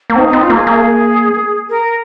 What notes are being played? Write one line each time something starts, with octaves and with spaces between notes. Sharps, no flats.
A#3
C4 D#4
D#4
C4
F4
A#3
G#4
A#3
A#4